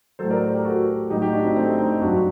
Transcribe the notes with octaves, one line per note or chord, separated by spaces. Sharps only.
A2 F#3 A4 C5
A#4 D5
A4 C5
G4 A#4
F#4 A4
A2 F#3 D#4 G4
D#4 G4
D4 F#4
C4 D#4
A3 C4
C4 D#4
G2 F#3 D4 F#4